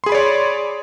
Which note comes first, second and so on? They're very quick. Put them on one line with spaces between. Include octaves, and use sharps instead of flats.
C6 G#4 B5 D5 C#5